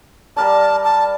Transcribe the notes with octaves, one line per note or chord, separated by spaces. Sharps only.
G3 A#4 D5 A5
A5